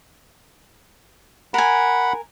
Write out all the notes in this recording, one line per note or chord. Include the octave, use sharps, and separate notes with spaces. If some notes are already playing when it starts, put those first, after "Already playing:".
A#4 F#5 G#5 B5